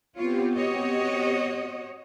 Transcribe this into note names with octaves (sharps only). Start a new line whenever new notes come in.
B3 C4 F4 G4 C#5
F#4 C#5 D#5